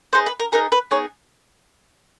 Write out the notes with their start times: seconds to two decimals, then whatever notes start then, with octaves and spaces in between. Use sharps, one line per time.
0.13 B3 D#4 G#4 C5
0.26 B4
0.40 A#4
0.52 B3 D#4 G#4 A#4
0.72 B4
0.91 B3 D#4 G#4 C#5